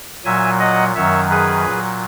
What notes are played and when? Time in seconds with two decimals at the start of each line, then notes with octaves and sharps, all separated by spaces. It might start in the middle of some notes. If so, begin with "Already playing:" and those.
0.25 A#2 F#3 E5 G#5
0.60 D#5 F#5
0.95 F#2 D#3 F#3 C#5 E5
1.30 G#4 B4
1.65 A#2 F#3